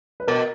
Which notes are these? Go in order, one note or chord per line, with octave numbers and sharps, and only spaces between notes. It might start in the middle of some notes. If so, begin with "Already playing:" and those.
B4
B2 A#4